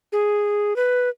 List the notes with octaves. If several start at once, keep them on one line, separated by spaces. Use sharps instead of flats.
G#4
B4